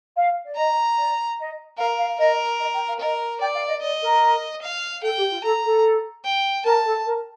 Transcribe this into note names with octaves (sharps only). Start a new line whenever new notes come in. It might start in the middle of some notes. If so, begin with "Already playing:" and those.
F5
D5
D#5 A#5
D5
D#5
A#4 F5
F5
A#4 D#5
D#5
G5
F5
A#4 D#5
D5 G5
F5
D#5
D5 D#5
A#4
F5
A4 G5
G4
F4
A4 A#5
A4
G5
A#4 A5
A4
A#4